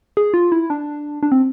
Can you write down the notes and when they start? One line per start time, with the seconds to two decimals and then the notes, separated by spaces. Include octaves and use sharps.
0.17 G#4
0.34 F4
0.52 E4
0.70 D4
1.23 D4
1.32 C4